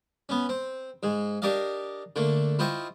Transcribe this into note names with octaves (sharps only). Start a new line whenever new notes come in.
B3 C#4
C4
G#2 G#3
D4 G4 A#4 D5 D#5 F5
D3 A3 A#3
E4 F4 C5 D#5 G5 C#6